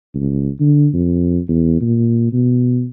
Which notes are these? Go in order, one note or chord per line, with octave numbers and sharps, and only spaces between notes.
C#2
D3
F2
E2
A#2
B2